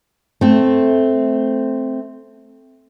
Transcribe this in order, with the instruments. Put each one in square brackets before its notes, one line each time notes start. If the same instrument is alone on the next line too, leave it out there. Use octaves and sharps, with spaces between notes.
[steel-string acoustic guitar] A3 C4